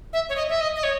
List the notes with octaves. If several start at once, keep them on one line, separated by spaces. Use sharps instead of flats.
E5
C#5
D#5
E5
D#5
D#5
C#5